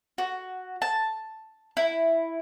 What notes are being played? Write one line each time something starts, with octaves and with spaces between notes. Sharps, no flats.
F#4
A5
E4